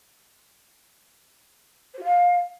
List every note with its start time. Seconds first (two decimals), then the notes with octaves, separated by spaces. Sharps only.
1.94 C5
1.99 F#4
2.04 F5